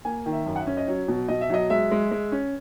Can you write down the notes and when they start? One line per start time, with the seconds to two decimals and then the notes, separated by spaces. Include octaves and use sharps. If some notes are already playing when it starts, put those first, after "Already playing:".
0.05 A#3 G#5
0.26 D#3
0.33 E5
0.46 F#2
0.56 F#5
0.60 E5
0.67 C#4
0.77 D#5
0.87 F#3 C#5
1.08 B2
1.28 B2 D#5
1.41 E5
1.50 F#3 D#5
1.70 G#3 E5
1.91 G#3
2.11 G#3
2.32 C#4